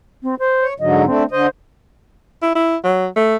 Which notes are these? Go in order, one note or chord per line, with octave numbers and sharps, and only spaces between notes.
C4
C5
C#5
G#2 D3 F#3 D#5
A3 C4 D4
D3 C5 D#5
E4
E4
F#3
A3